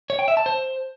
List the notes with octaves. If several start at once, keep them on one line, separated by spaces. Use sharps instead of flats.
C#5
G5
E5
A5
C5